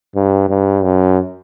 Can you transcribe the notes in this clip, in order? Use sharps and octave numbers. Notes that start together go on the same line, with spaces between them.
G2
G2
F#2